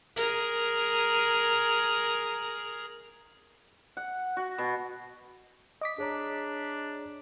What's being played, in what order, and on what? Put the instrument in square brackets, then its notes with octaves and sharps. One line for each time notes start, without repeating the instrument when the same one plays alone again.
[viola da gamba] G#4 A#4
[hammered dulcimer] F#5
F#4
B2
[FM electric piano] D#5 D6 B6
[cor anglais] D4 [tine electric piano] G#4 C#5 A#5